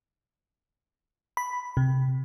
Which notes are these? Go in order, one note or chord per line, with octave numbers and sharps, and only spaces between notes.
B5
C3